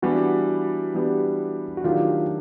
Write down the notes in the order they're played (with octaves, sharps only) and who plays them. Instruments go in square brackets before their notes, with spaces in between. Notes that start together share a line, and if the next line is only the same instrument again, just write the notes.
[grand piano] E3 G3 B3 D4 G4 [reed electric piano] F#4
[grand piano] E3 G3 B3 D4 G4
[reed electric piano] F#4
[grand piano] D#3 F#3 A3 D4 G4 [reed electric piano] F4